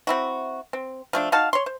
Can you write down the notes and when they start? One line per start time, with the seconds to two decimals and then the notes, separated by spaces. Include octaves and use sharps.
0.07 C4 E4 F#4
0.73 C4
1.13 F3 A3 D4
1.32 D#4 F#4 F5 A5
1.53 C#5 C6
1.66 C5